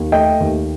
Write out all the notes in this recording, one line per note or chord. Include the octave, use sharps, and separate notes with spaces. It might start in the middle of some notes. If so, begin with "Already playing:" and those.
Already playing: D#2
A3 D#5 G5
D#2